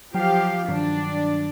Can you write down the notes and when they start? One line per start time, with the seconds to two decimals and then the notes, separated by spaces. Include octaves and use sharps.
0.14 F3 F#3 G4 F5 G5
0.68 G2 D#3 F#3 D4